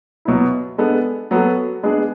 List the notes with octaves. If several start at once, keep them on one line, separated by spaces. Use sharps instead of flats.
B2 F#3 B3 E4
G#3 B3 D4 A4
F#3 B3 F#4 A4
G#3 B3 D4 G#4